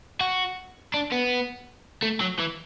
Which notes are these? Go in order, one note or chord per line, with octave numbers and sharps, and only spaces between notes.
F#4
D4
B3
A3
F#3
E3